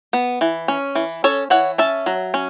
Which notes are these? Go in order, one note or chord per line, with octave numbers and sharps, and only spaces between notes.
B3
E3
C#4
E3
C#4 A4 C#5
E3 C#5 F#5
C#4 E5 A5
F#3
C#4